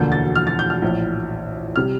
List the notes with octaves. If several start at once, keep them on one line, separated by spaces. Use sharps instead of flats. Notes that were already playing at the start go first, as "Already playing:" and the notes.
Already playing: E1 D2 D3 F3 A#3 G6
A6
F6
A6
G6
F6
A#1 A2 E3
C3 G3 F6